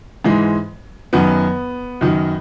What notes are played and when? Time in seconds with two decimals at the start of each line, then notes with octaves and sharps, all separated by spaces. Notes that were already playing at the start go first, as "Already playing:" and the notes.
0.24 G#2 E3 G#3
1.13 F#2 D#3 F#3 B3
2.01 F#2 D#3 F#3